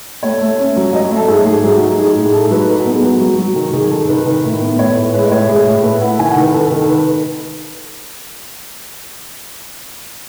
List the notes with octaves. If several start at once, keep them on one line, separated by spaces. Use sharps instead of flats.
A3 C#5
A3
C#4
F#3
F#3 D#5
C#5
A3
A4
G#2 G#4
A3 G#4
F#3 G#4
F#4
D#4
G#4
D#4 G#4
A2
G#4
D#4 A4
F#3 B4
D#4 A4
F#4
B3
G#4
F#3 F#4
F#3
F#3
D#3
D#3 G#4
D#3 A4
D#3 B4
D#3
A2
B3
A2 C#5
A2 B4
G#3 B4
D#5
A2 C#5
A2 G#4
A2
A3 B4
E4 F#5
D#3 G#5
F#5
D#3
B4
D#3 A4
A4
D#3
A4
D#3 B4